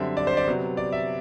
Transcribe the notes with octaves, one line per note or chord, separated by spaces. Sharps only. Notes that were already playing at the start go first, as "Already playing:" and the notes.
Already playing: F#2 D3 G3 C4 E5
D5
C5
D5
C3 F#3 B3
D5
E5